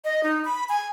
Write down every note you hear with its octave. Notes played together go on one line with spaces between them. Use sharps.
D#5
D#4
B5
G#5